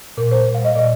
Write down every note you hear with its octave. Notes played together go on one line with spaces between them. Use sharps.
A#2 A#4
G3 C5
A#2
F5
G3 D#5
A#2 D5